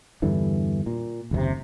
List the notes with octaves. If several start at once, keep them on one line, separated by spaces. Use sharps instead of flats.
E2 G2 D3 E3
A#2
F#1 D#2 A2 C3